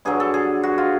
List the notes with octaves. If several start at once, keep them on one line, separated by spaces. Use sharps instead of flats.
G2 D3 F#3 G#4
A4
G#4
F#4
F4